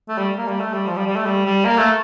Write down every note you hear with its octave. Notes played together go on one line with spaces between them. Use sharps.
A3
G3
A#3
G3
A3
G3
F3
G3
G3
A3
G3
G3
A#3
A3